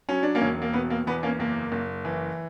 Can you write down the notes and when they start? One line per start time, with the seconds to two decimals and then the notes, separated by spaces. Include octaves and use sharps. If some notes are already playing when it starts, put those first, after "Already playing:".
0.09 F#3 C#4
0.23 D4
0.35 A#3 C#4
0.42 E1
0.62 A#3
0.73 B2 B3
0.90 A#3
1.07 E2 B3
1.23 A#3 C#4
1.39 F#1 A#3
1.72 F#1
2.05 E3